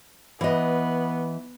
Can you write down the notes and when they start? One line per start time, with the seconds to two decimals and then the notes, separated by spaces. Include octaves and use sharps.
0.41 E3 B3 D#5